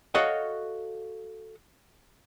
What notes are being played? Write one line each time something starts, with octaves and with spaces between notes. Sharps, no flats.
F#4 A4 C#5 D#5 F5 F#5